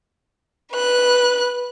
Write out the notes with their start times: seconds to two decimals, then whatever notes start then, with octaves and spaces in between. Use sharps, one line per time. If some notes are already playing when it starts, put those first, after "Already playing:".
0.72 B4 F#6